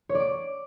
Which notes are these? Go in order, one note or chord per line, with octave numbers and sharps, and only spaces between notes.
C#5
D5
D6